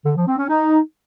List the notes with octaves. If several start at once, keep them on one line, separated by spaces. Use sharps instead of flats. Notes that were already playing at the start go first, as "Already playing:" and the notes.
D3
F3
C4
C#4
D#4